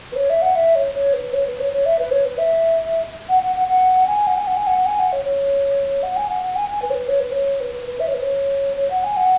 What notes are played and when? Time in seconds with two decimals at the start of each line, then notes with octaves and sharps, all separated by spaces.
0.12 B4
0.15 C#5
0.29 E5
0.42 F#5
0.55 E5
0.75 C#5
0.94 C#5
1.13 B4
1.33 C#5
1.47 B4
1.60 C#5
1.72 C#5
1.85 E5
1.99 B4
2.11 C#5
2.25 B4
2.37 E5
3.29 F#5
3.43 F#5
3.56 F#5
3.68 F#5
4.07 G#5
4.27 F#5
4.37 G#5
4.47 F#5
4.56 G#5
4.66 F#5
4.86 G#5
4.99 F#5
5.12 C#5
5.25 C#5
6.02 F#5
6.16 G#5
6.29 F#5
6.42 F#5
6.56 G#5
6.69 G#5
6.82 B4
6.90 C#5
6.94 B4
7.08 C#5
7.20 B4
7.31 C#5
7.60 B4
7.73 B4
7.86 B4
7.99 E5
8.07 C#5
8.14 B4
8.22 C#5
8.77 C#5
8.90 F#5
9.03 G#5
9.16 F#5